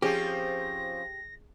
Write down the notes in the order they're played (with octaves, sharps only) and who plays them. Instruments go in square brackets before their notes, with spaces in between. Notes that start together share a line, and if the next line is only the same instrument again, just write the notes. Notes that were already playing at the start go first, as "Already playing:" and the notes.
[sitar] F3 C4 C#4 [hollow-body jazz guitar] G4 [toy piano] G#4 [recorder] A#6